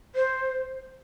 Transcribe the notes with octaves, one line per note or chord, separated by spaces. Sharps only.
C5